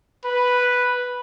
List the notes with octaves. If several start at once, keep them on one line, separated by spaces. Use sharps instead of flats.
B4